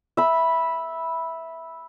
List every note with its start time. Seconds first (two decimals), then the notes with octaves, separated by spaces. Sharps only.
0.17 E5 B5